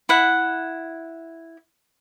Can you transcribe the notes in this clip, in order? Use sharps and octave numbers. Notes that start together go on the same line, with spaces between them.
E4 F#5